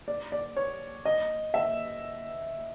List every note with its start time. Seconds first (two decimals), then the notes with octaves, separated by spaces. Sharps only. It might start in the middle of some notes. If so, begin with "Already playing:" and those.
0.08 D5
0.32 D5
0.56 C#5
1.05 D#5
1.54 E5